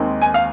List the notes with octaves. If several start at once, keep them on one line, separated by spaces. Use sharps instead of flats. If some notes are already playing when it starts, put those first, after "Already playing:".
Already playing: D#2 D#3 G#3 C4
G#5
F5